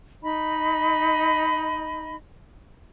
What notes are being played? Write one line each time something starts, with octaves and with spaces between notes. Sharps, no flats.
D#4 D#5 B5